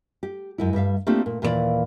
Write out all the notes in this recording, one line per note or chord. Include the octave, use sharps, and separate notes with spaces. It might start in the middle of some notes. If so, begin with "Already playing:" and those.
G4
F#2 G#3 E4
G2 G3 E5 F5
A3 A#3 C4 D4 F4 G4
A#2
D#2 A#2 E3 A#4 D5 F5